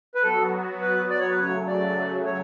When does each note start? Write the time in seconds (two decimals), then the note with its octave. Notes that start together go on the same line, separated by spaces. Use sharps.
0.15 B4
0.23 F#3 B3 F#4 A4
0.81 B4
1.10 D5
1.20 C#5
1.30 B4
1.39 C#3 F#3 A3 C#5
1.68 D5
2.25 C#5